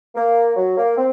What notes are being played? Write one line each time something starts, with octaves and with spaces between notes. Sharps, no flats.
A#3
F#3
A#3
C4